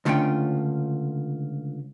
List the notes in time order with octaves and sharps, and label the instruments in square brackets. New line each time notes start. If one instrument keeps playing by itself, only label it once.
[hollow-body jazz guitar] C#2 D3 A3 C#4 F4 G5